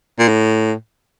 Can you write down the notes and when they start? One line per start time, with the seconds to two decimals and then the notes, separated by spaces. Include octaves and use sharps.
0.19 A#2
0.28 A2